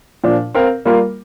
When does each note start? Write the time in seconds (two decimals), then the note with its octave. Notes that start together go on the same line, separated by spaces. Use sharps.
0.24 A#2 F3 D4
0.54 C4 A#4 F5
0.85 G3 A#3 F4 A#4